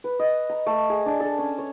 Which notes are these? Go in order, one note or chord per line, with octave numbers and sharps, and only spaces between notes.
B4
D#5
A#5
A3
G#4
D4
A4
C#4
C#5